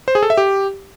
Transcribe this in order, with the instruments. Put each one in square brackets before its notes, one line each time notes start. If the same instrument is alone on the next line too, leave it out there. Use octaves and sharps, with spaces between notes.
[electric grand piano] C5
G#4
A4
E5
G4